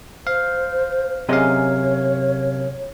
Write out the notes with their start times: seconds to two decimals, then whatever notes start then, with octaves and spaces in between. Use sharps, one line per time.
0.27 C5 F5
1.29 F#2 C3 G#4 C#5 D#5 F5